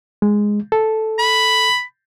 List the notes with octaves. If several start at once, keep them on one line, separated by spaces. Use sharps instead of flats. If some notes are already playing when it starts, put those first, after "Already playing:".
G#3
A4
B5